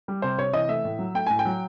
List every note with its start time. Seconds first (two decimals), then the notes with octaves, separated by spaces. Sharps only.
0.08 G3
0.22 C3 C5
0.38 C3 C#5
0.53 E3 D#5
0.68 A3 E5
0.84 A2
0.99 F#3
1.14 A3 G5
1.27 A2 G#5
1.39 G5
1.45 F#3